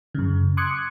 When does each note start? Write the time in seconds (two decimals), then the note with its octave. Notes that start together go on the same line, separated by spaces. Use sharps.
0.15 F#2 C#3
0.57 C6 D6 D#6 F#6 G#6 C#7